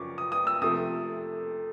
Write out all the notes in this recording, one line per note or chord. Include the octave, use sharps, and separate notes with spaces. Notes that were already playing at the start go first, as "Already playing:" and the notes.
Already playing: F#2 C#3 F3 C#6 D6
D#6
D#6
E6
C3 F3 A3 D#6